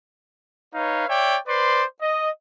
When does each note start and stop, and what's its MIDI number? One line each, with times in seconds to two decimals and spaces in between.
0.74 1.08 63
0.74 1.08 71
0.74 1.08 73
0.74 1.08 77
1.08 1.38 73
1.08 1.38 74
1.08 1.38 76
1.08 1.38 79
1.47 1.83 71
1.47 1.83 72
1.47 1.83 74
1.47 1.83 84
2.01 2.29 75